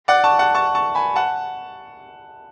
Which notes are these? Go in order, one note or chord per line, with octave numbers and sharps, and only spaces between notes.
D5 F#5
A5 C#6
F#5 A5
A5 C#6
A5 C#6
G#5 B5
F#5 A5